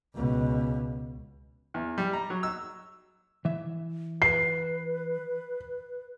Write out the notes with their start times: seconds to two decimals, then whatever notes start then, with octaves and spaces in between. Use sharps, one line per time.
0.14 C#2 B2
1.74 E2
1.98 G3
2.13 A#5
2.30 F#3
2.43 E6
3.45 E3 E5
4.22 B4 C7